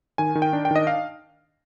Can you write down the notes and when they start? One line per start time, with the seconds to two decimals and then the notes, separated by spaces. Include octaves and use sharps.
0.18 D#3 G#5
0.35 D#3
0.42 G5
0.53 D4
0.65 G5
0.71 D#3 D#5
0.87 F5